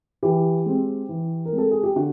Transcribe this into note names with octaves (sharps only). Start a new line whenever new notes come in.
E3 G4
G#3 C4
E3
A#4
G#3 C4
A4
G#4
G4
D3 F#4